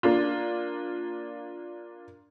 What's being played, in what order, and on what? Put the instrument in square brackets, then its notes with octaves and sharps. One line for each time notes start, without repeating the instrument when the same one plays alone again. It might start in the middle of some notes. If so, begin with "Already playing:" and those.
[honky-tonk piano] A#3 D4 F4